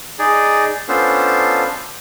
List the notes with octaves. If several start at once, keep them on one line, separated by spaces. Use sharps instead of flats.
D#4 G#4 D5
B3 C#4 D4 F4 A4 C5